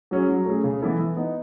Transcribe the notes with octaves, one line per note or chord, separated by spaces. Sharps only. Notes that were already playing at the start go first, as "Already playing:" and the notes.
F#3 C#4 G#4
F#3
A3 C#4 G#4
C#3
E3 B3 E4 A4
E3
B3 D#4